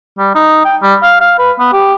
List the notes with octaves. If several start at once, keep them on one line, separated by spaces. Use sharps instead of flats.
G3
D#4
G5
G3
F5
F5
B4
B3
G4